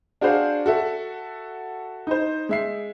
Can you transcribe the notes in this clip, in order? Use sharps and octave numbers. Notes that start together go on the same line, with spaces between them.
D4 F#4 G#4 C5 F5
F#4 A4 E5
D#4 C5
G#3 E5 C7